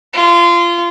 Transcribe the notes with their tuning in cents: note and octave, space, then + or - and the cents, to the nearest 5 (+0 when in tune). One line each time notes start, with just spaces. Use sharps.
F4 -25